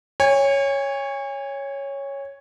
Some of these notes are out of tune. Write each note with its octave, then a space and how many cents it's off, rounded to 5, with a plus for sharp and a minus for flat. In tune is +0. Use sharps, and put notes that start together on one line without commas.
C#5 +0 G#5 -35